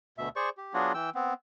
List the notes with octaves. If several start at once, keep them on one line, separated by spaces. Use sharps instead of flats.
D2 B2 E5
G#4 C5 D5 C#6
G4
F#3 B3 D4 F4 F#4 G#4
E3 G5 E6
B3 C4